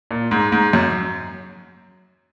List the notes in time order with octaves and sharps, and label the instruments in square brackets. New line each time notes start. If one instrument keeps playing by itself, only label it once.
[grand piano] A#2
G#2
G#2
F#2